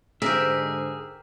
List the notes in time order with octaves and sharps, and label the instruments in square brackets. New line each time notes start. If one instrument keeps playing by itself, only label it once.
[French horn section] G#2 D3 C5 [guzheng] G4 A#4 [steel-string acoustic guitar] G#4 [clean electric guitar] E5